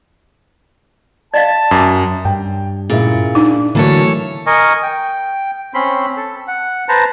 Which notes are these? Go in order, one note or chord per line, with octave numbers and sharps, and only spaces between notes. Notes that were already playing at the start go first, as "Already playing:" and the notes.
D5 D#5 F5 A5
F#2 D6
G2 G5
A#2 C#3 A#3 E4
D4 D#4
A2 D3 E3 F#3 A#3 A4 C#5
A#4 D#5 G#5 C#6
G5
C4 C#4 B5 C6
A4
F#5
B4 C5 A5 A#5